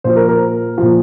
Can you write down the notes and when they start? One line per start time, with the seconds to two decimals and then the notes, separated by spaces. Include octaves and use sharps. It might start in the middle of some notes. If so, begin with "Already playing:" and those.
0.04 A#2 F3 C5
0.16 A#4
0.29 A#4
0.78 A#2 F3